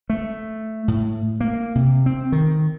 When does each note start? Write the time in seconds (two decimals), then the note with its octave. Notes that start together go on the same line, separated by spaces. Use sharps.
0.10 A3
0.88 A2
1.41 A#3
1.75 C3
2.06 C4
2.32 D#3